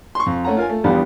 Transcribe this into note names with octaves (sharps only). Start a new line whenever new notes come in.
C6 C#6
F2
A3 C#4 F#5 A#5
F4 A#4 G#5
A3
A#1 E2 G3 B3 G4 F5